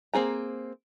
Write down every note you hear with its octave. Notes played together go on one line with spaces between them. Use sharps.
A#3 C4 G#4 A#5